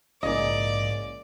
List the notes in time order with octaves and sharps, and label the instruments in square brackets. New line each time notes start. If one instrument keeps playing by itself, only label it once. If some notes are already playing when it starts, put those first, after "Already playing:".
[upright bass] A#1 G#2 [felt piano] C#3 E3 A#3 [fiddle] D5 [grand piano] D#5